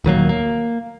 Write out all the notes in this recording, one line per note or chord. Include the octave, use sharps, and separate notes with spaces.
D#1 D#3 F#3 A#3
A#3